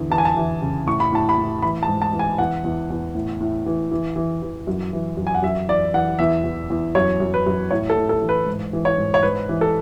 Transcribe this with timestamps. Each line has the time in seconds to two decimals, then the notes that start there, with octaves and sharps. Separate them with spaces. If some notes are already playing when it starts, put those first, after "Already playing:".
Already playing: E2 D3
0.10 E3 A5
0.18 G#5
0.25 A5
0.37 E3
0.62 C#3
0.87 A2 C#6
1.00 B5
1.12 A2 A5
1.29 B5
1.38 A2
1.62 E3 B5
1.83 A5
1.88 G#2
2.02 A5
2.13 E3
2.19 G#5
2.38 E2 F#5
2.64 E2
2.90 E2
3.15 A2
3.41 A2
3.66 E3
3.91 E3
4.16 E3
4.42 E3
4.67 F#2
4.93 E3
5.17 F#2
5.27 G#5
5.34 F#5
5.43 F#2 E5
5.68 E3 D5
5.94 E3 F#5
6.19 E2 E5
6.44 E2
6.70 E2
6.95 F#2 C#5
7.20 F#2
7.34 B4
7.46 F#2
7.71 A2 C#5
7.90 A4
7.97 A2
8.09 A4
8.21 E3
8.29 B4
8.47 G#2
8.73 E3
8.85 C#5
8.98 G#2
9.14 C#5
9.23 G#2 B4
9.49 E3
9.61 A4